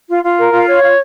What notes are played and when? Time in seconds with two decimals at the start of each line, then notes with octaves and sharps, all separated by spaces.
0.08 F4
0.23 F4
0.38 A#4
0.53 F4
0.68 C#5
0.83 F4